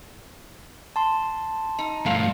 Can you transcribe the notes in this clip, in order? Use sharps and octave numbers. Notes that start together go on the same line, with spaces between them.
A5 C6
D#4
E2 G2 F3 A3 F5